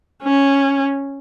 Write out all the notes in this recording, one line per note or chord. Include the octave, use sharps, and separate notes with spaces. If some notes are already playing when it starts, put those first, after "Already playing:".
C#4